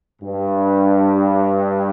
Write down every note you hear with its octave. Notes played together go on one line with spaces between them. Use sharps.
G2